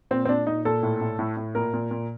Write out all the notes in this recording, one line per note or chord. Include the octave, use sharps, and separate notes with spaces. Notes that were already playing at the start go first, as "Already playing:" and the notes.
A#2 C4
C4
A#2 D4
A#2 D#4
A#2 A4
A2
A2
A2
A2
A#2 A#4
A#2
A#2